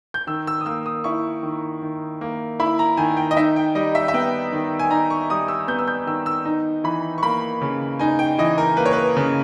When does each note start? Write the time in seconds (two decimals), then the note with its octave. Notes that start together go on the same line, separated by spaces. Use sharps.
0.14 G6
0.27 D#3 E6
0.47 E6
0.61 D#6
0.66 A#3 E6
0.86 D#6
1.04 E4 C#6
1.43 D#3
1.82 D#3
2.21 A#3
2.60 E4 B5
2.79 A#5
2.97 D#3 G#5
3.17 G5
3.31 D#5
3.37 D#4 E5
3.56 G5
3.75 G3 D#5
3.95 E5
4.08 E5
4.14 B3 G5
4.52 D#3
4.79 G#5
4.91 D#4 A#5
5.10 C#6
5.30 G3 D#6
5.48 E6
5.68 B3 G6
5.79 E6
5.88 G6
6.07 D#3 E6
6.26 E6
6.45 D#4
6.84 E3 B5
7.18 C#6
7.23 A#3 B5
7.61 C#3
7.99 D#4 G#5
8.19 G5
8.39 E3 D#5
8.58 A#4
8.77 A#3 B4
8.86 C#5
8.93 B4
9.17 C#3